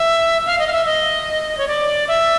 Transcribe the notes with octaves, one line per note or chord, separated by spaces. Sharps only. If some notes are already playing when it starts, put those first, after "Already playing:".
Already playing: E5
F5
D#5
F5
E5
D#5
C#5
D5
E5